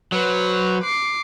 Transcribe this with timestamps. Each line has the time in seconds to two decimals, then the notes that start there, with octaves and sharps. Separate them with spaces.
0.12 F#3 B4 C5
0.83 D6 C7